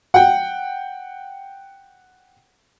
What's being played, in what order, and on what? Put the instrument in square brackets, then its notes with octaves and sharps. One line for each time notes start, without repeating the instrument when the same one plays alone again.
[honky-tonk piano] F#5 G5